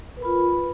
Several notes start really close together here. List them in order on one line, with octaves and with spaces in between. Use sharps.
B4 A#4 B5 F4